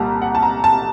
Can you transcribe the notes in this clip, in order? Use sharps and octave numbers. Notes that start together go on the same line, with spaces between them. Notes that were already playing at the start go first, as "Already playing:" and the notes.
Already playing: C2 A#2 G3 A5 A#5
F#5
A5
A#5
A5